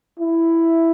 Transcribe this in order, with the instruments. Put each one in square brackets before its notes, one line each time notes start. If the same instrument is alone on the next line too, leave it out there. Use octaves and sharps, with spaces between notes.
[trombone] E4